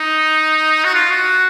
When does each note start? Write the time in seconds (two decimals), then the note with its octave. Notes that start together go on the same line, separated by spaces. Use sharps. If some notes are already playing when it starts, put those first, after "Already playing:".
Already playing: D#4
0.84 F#4
0.95 F4
1.11 F#4